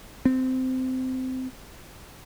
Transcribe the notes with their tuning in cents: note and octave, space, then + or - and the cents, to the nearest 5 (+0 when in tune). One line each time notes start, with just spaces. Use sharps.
C4 -20